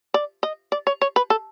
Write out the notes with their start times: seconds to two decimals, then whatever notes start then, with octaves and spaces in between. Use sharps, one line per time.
0.14 D5
0.43 D#5
0.72 D5
0.87 C#5
1.01 C#5
1.16 B4
1.30 A4